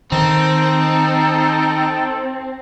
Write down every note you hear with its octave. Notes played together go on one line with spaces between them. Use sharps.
D#3 C4 D#4 A4